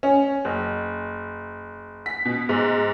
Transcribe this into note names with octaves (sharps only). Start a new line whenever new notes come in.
C#4
F#1
B6
B2
G#2